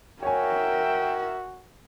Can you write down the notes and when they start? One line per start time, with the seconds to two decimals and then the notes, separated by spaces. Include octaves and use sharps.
0.23 F#4 A#4 C#5 E5 G5 G#5